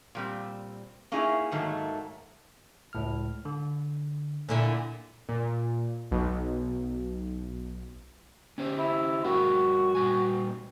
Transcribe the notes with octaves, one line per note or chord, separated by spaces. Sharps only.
A#2 G3 C4
A#3 C#4 D#4 E4 G#4
G#2 D#3 F#3 A3 A#3
C#2 A2 F6
D3
A#2 D3 E4 G#5
A#2
B1
C#4 G4 C5
E4
G2 F#4 A#4 G5
A#2 G3 G#5